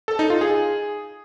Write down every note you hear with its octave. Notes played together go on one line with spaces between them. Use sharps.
A4
D#4
F4
G#4